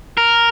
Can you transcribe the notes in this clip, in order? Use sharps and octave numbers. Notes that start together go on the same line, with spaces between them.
A#4